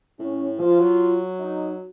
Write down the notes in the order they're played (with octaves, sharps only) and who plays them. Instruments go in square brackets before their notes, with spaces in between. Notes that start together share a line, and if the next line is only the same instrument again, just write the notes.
[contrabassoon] A2 [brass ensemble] C#4
[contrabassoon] F3 [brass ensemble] F4
[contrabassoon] F#3
[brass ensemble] D#4